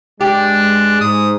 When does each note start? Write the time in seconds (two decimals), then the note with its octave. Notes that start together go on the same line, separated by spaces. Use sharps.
0.21 G#3 D4 G4
1.00 G#2 D#6